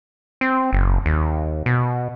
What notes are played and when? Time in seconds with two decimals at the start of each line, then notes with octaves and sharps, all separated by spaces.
0.41 C4
0.73 F#1
1.06 D#2
1.66 B2